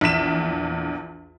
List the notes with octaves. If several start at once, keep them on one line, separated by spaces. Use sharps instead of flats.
A#1 E2 B6 E7